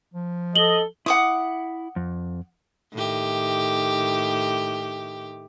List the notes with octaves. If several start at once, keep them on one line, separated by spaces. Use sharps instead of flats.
F3
A4 D#5 F#7 G7
E4 F#5 D6 D#6
F2
A2 D#3 G4